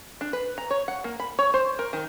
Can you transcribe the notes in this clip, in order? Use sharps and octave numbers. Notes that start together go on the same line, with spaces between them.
D4
B4
A#5
C#5
F#5
A#3
B5
C#5
C5
A#4
D#3